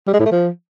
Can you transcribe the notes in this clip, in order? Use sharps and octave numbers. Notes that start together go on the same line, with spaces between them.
G3
G#3
A2
A3
F3